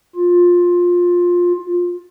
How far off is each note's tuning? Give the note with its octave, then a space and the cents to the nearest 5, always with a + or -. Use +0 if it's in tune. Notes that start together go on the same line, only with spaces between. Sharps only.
F4 +15